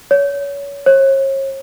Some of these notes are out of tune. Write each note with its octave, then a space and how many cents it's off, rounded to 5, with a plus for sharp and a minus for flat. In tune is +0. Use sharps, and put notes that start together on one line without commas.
C#5 +30
C#5 -40